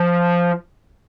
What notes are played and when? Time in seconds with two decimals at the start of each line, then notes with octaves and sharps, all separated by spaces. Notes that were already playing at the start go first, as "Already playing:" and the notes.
Already playing: F3